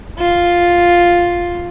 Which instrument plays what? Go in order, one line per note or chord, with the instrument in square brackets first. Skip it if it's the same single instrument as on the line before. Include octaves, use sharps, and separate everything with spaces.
[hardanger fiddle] F4